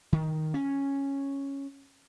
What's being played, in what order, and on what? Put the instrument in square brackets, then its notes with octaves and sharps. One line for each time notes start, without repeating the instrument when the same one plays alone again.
[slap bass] D#3
C#4